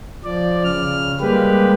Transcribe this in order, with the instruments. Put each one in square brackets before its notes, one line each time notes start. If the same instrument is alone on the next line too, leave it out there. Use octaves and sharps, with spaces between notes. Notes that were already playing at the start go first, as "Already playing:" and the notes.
[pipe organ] F3 D5
C#3 F6
G3 G#3 A#3 G4 B4